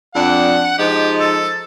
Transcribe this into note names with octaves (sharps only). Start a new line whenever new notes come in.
F2 D4 F#5
F3 G#3 D#4 G4
A4